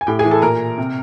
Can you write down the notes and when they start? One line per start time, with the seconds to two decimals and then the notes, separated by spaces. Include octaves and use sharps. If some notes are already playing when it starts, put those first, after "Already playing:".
0.01 G#5
0.07 A2 G4 G5
0.19 G#4 G#5
0.25 E3
0.31 A4 A5
0.42 A#2 A#4 A#5
0.78 C3